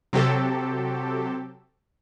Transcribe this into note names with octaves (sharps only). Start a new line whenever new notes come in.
C3 F#3 C4 G4 A4